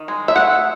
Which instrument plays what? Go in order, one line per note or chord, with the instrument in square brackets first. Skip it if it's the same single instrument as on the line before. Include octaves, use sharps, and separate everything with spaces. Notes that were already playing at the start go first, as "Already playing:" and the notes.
Already playing: [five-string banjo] D#3
G#3
E5
A3 F#5